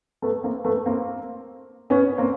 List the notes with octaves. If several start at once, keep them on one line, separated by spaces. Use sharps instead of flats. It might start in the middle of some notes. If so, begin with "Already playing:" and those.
A3 B3
A#3 C4
A3 B3
A#3 C4
B3 C#4
A#3 C4